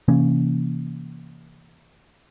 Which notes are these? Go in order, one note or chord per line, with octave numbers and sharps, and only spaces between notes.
C3 E3 A#3 C#4